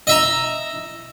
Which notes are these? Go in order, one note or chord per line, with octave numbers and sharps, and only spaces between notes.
D#5 E5 A#5